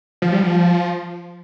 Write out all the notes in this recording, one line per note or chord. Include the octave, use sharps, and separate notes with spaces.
F3
G3
F3